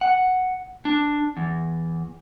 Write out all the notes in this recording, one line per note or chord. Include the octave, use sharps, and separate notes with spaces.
F#5
D4
E2